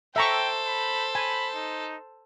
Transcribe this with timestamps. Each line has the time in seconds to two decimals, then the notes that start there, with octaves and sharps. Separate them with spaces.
0.16 A4 C5 E5 G5 A#5 C#6
0.67 B5
1.15 G#5 B5
1.55 D#4